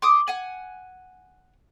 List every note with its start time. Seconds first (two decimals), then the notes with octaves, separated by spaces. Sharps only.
0.02 C6 D6 D#6
0.28 F#5 G#5